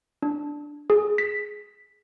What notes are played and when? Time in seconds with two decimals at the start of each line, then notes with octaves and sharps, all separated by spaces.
0.22 D4
0.90 G#4
1.18 B6